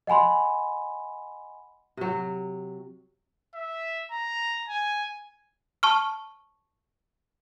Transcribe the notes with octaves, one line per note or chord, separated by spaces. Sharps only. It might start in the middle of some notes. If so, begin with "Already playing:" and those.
D#5 F#5 G#5 B5 C6
C3 F#3
E5
A#5
G#5
A5 C#6 F6